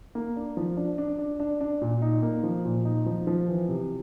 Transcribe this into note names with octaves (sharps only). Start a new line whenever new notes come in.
A#3
D4
F3
D4
D4
D4
D4
D4
A#2
D#4
A#3
F3
A#2
D#4
F3
F3
E3
C3